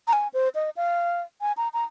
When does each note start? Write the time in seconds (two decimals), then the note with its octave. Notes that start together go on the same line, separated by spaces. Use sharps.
0.08 A#5
0.13 G#5
0.34 C5
0.55 D#5
0.77 F5
1.41 G#5
1.57 A#5
1.73 A#5